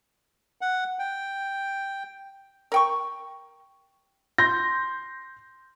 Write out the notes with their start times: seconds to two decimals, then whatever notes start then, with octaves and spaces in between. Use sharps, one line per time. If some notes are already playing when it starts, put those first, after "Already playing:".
0.61 F#5
0.99 G5
2.72 A#4 G5 C#6
4.38 C6 G6 A#6